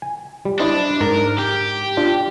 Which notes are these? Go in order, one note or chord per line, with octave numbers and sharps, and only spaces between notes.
G#5
G3
D4 E4 C5 D#5
G#2 A#4
G4
D4 F4 D5